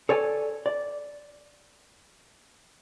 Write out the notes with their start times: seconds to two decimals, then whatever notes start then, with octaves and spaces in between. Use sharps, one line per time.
0.09 A4 C#5 D5 G#5
0.66 D5